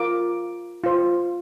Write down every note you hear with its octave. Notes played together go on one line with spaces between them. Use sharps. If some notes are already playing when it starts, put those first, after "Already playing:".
Already playing: F4 A#4 D6
F4 C5